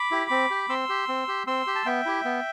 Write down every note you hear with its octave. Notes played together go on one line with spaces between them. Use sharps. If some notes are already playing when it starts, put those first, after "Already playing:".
Already playing: B5 D6
E4 G4
C4
G4
C4 C6 E6
G4
C4
G4
C4 C6 E6
G4
A5
B3 E5 G5
E4 G4
B3